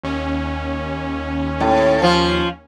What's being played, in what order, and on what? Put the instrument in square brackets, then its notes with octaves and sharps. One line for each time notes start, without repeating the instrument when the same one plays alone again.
[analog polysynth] D#2 C#4
[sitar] A2
F3 F4